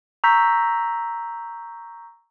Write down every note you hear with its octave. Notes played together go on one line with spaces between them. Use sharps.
A#5 C#6 E6 G6 A#6 B6